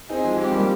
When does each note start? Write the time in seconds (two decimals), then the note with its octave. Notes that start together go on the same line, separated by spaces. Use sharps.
0.09 C4 D#4 G#4
0.24 F3 G#3
0.37 G#3 C4 G4
0.52 G3 A#3